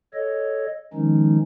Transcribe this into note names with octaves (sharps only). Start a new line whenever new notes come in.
A4 C#5 D#5
D#3 F3 G#3 C#4 D#4